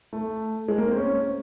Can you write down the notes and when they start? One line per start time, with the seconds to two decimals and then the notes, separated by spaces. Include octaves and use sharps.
0.13 A3
0.68 G#3
0.78 A#3
0.88 C4
0.97 C#4